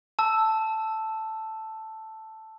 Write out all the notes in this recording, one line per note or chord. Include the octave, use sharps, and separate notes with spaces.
A5 E6